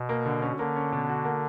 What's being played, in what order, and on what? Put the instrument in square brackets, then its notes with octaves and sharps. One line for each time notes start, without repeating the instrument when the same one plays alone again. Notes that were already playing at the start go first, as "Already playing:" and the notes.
Already playing: [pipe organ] B2
[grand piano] A#3
D3
C#4
[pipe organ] D3 [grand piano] A#3
[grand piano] C#4
B2
F#4
A#3